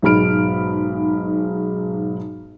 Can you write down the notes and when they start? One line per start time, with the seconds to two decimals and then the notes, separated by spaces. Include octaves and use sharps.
0.02 B1 G#2 G#3 B5 F6 D7